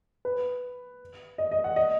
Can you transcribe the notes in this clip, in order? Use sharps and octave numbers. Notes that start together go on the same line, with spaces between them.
B4
D#5
D#5
F#5
D#5